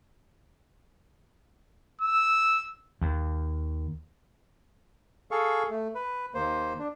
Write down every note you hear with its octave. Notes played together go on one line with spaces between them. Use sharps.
E6
D#2
G#4 A4 F5 C#6
A3
B4
D#2 A#3 C5
D4